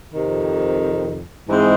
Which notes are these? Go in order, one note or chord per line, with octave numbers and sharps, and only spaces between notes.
F2 C3 D#3
G#2 E3 G#3 C4